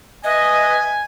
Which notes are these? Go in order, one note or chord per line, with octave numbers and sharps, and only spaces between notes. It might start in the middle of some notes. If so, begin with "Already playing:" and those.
B4 D#5 E5 G#5 F#6